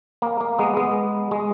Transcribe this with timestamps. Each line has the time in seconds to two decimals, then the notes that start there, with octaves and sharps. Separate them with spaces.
0.22 A#3
0.41 A#3
0.59 G#3 B3
0.77 G#3 B3
1.31 G#3